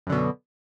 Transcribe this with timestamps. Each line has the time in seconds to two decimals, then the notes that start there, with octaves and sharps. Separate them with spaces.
0.07 F#2
0.09 D3
0.12 B2